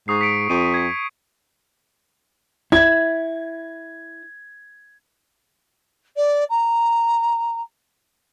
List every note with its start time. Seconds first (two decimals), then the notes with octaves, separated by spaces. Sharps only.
0.08 G#2 C#6 D#6 C7
0.21 B6 C#7 D7
0.50 F2 D#7
0.74 G#6 B6
2.72 E4 G#6
6.16 D5
6.49 A#5